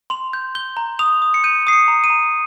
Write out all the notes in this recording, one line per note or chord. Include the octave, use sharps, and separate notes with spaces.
C6 F7
G6
G6 G7
A#5
D#6 F7
D#6
C#7
G6 D#7
D#6 C7
C#7
A#5
D#7
A#5